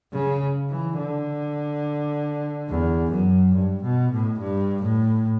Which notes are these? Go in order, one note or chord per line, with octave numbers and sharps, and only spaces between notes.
C#3
E3
D3
E2
F#2
G2
B2
A2
G2
A2